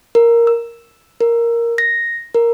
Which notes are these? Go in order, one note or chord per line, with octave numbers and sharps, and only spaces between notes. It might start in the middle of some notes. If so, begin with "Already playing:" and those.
A#4
E6
A#4
A#6
A#4